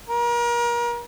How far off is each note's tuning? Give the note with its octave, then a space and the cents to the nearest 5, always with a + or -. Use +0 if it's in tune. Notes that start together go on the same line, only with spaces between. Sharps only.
A#4 +35